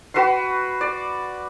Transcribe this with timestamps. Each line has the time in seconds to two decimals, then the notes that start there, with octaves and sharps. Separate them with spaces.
0.14 F#4 B4 B5 C6
0.81 D5